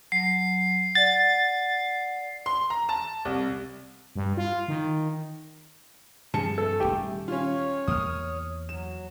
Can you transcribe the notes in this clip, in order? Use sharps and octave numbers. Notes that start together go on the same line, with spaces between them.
F#3 C7
D5 F#5 A6
C6
A#5
A5
C2
G2
F4
D#3
G2 C3 F3 G#4 A5 C#7
A3 A4
D#1 G#1 D#3 G4
C#4 F4 C#5
E2 A#3 D#6 F6
F#3 E7